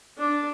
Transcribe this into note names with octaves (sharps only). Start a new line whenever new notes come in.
D4